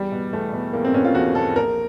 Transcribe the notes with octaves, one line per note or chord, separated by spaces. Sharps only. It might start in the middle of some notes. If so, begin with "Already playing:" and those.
Already playing: E2 G3
B2
E2 A3
B2
E2 A#3
C4
B2 C#4
F4
E2 F#4
B2 A4
A#1 A#4